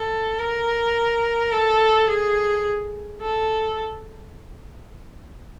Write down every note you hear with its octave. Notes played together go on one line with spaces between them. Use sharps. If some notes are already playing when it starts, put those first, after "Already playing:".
Already playing: A4
A#4
A4
G#4
A4